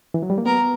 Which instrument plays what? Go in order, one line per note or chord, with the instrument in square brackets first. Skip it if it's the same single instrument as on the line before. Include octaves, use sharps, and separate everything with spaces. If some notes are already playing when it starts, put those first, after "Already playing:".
[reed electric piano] E3
F#3
G3
A#3
[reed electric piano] B3 [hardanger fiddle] A#4